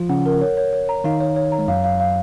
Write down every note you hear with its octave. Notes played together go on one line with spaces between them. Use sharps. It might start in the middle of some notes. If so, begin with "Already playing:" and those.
Already playing: F3 F4
C#3 C#4 F#5
A#4
C#5
C#5
C#5
A#5
D#3 D#4 F5
C#5
C#5
A#5
G#3
F#2 F#3 F5
F5
F5